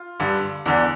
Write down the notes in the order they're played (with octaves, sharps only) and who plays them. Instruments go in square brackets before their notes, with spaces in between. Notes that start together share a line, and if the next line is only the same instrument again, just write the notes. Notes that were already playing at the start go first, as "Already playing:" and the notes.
Already playing: [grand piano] F4
G2 D3
E2 D3